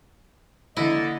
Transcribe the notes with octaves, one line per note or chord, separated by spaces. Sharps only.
D3 A#3 E4 D#5